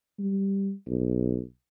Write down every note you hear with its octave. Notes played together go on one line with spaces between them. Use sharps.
G3
B1